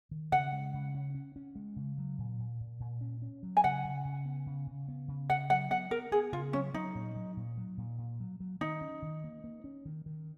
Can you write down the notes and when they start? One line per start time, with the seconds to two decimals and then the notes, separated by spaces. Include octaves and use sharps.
0.11 D#3
0.32 C#3 F#5
0.52 G#3
0.74 C#3
0.94 C#4
1.15 C#4
1.36 C#4
1.56 G#3
1.76 C#3
1.98 F#3
2.18 A#2
2.39 A#2
2.60 A#2
2.80 A#2
3.01 C#4
3.22 C#4
3.43 F#3
3.57 G#5
3.64 C#3 F#5
3.85 C#3
4.05 C#3
4.26 B3
4.46 C#3
4.67 C#3
4.88 B3
5.08 C#3
5.30 C#3 F#5
5.50 F#3 F#5
5.71 B3 F#5
5.91 B3 A#4
6.12 B3 G#4
6.32 C#3 F4
6.53 F#3 C#4
6.74 F#3 D#4
6.95 A#2
7.16 F#3
7.37 A#2
7.58 F#3
7.78 A#2
7.98 A#2
8.20 F#3
8.40 F#3
8.61 D#3 D#4
8.81 C#4
9.02 D#3
9.24 A#3
9.44 A#3
9.64 C#4
9.85 D#3
10.06 D#3